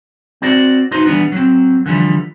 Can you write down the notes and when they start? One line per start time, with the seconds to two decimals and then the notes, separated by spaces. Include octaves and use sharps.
0.42 C4 F#4 C5 D5
0.91 D#4 F#4 B4 C5
1.06 E3 G3 B3 D4
1.32 F#3 C4
1.86 D3 E3 F3 G3